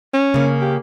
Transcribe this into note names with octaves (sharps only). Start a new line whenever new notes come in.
C#4
C#3 A#3
G4